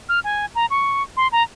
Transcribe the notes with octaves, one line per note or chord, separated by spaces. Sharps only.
F6
G#5
A#5
C#6
C6
A#5